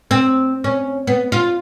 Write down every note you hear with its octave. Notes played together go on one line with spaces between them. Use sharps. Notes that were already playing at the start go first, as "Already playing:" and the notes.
C4
C#4
B3
F4